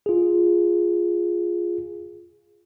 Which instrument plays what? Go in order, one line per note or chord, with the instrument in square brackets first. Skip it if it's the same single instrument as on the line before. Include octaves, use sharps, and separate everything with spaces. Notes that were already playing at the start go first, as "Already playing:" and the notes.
[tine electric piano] F4 G#4